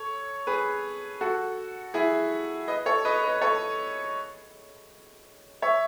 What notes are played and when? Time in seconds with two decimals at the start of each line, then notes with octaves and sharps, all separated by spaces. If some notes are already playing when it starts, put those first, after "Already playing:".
Already playing: A4 C#5
0.47 G#4 B4
1.21 F#4 A4
1.94 E4 G#4
2.68 B4 D#5
2.86 A4 C#5
3.05 B4 D#5
3.24 B4 D#5
3.42 A4 C#5
5.62 C#5 E5